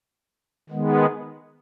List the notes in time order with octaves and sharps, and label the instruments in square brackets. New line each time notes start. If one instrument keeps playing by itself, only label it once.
[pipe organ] D#3 G#3 B3